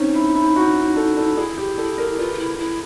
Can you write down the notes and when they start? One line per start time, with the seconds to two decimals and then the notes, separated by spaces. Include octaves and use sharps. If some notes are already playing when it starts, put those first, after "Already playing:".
Already playing: C4 C#4 D#4
0.15 E4
0.35 E4
0.56 F#4
0.96 A4
1.17 A4
1.37 E4 G#4
1.58 G4
1.78 A4
1.98 A#4
2.19 F4 B4
2.34 F4
2.39 E4
2.59 E4